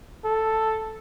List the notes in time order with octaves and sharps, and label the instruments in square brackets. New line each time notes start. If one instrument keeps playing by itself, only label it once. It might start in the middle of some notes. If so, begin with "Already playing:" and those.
[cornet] A4